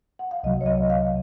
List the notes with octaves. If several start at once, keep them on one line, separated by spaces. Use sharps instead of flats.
F#5
F5
C2 C3 F#3 D#5
C#5
D#5
F5